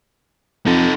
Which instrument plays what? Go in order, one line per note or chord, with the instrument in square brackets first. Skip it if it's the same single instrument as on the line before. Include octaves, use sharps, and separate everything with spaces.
[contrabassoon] F2 [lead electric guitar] D#4 A4